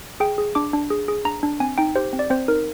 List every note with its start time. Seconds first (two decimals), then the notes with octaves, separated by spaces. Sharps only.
0.20 G#4 G5
0.38 G#4
0.55 D4 D6
0.73 D4
0.90 G#4
1.08 G#4
1.25 D4 A#5
1.43 D4
1.60 C4 G#5
1.78 D#4 G5
1.96 G4 C5
2.13 C4
2.19 D5
2.30 C4 C5
2.48 D#4 A#4